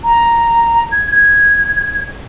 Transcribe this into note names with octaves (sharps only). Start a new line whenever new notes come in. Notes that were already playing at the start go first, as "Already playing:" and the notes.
A#5
G#6
G#6